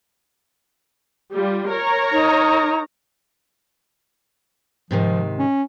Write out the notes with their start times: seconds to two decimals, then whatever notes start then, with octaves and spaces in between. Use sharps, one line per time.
1.34 G3 F4
1.70 A#4 C#5 A#5
2.12 D#4
4.91 G#2 C3 D#3 F3
5.39 C#4